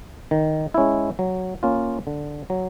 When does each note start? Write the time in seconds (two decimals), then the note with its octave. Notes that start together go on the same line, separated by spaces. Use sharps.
0.31 D#3
0.74 G#3 C#4 E4
1.19 F#3
1.63 A#3 C#4 F4
2.07 D3
2.50 F#3